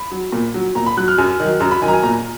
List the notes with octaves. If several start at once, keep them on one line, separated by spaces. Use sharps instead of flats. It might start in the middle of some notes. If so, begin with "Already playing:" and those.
Already playing: B5
F#3
A#2
F#3
A#2 A#5
B5
F#3 F#6
F6
F#2 G#5
D#3 F#3
F#2 A#5
B5
D#3 F#3 G#5 A#5
G#5
A#2 A#5